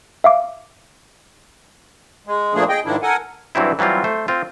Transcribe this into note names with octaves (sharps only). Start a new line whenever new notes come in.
E5 F5 D6
G#3
A#2 F3 A3 A#3 D4 G#4
G#4 D#5 G5
G#2 D#3 F3 D4 E4
A4 A#4 F#5 G#5
G2 E3 F#3 C4 E4
E3 F#3 G3 C4 F4
A3 C5
C4 F4